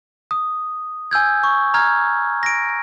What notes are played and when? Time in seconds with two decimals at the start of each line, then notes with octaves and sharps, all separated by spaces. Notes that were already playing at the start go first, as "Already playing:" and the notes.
0.31 D#6
1.11 G#5 E6 G6 G#6
1.43 C#6
1.74 A#5 F6 G#6
2.43 A#6 D7